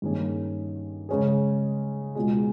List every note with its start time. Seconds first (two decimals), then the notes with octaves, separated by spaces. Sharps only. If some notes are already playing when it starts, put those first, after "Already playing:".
0.02 G2 D#3 A#3 C#4 G#4
1.09 C#3 G#3 C#4 G#4
2.15 C#2 B2 G#3